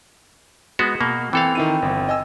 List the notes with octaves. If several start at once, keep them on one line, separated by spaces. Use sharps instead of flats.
G#3 B3 F#4
B2 A#3
E3 C4 A4 F5
D#3 C4 E4 D#7
G1
D#5 G#5 E6